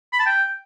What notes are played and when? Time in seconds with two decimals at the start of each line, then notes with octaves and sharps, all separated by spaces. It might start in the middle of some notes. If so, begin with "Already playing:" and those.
0.13 B5
0.20 A5
0.26 G5